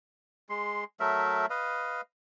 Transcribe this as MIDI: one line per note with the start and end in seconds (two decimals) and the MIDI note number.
0.49 0.84 56
0.49 0.84 84
1.00 1.46 54
1.00 1.46 57
1.00 1.46 70
1.00 1.46 76
1.50 2.01 71
1.50 2.01 75
1.50 2.01 77